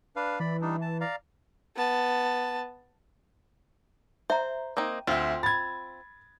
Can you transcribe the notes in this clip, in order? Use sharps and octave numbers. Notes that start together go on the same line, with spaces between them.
D4 B4 F5
E3 D5 B5
G3 D4 D#4
A5
D5 F5 A#5
B3 A5
C5 E5 A#5
A#3 C4 D#4
D2 C4 F4 E5
B5 G#6 A6